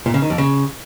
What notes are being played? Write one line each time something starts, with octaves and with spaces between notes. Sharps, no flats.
A#2
C#3
D#3
F2
C#3